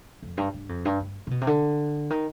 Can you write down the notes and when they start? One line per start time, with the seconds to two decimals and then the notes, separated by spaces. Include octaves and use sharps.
0.22 F2
0.37 G2
0.54 G2
0.69 F2
0.85 G2
1.00 G2
1.27 C3
1.31 B2
1.41 C3
1.47 D3
2.10 D#3